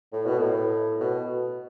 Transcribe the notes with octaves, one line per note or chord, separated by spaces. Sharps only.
A2
B2
A2
B2